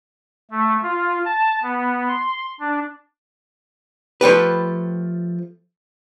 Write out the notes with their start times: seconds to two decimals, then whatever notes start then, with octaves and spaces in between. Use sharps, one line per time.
0.51 A3
0.83 F4
1.25 A5
1.63 B3
2.08 C6
2.60 D4
4.21 F3 A3 G4 B4